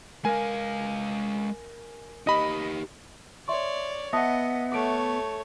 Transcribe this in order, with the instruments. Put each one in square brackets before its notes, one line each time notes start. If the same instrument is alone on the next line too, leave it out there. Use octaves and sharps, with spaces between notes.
[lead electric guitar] G#3 F5 [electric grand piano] A#4 G#5
[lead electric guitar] D#4 G4 [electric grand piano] D#5 B5
[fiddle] C#5 D5 [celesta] E5 C6 C#6
[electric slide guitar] B3 [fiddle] D#5 [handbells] E5 F#5 [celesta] A5 D#6 A#6
[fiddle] A3 C#5 [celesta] D6 D7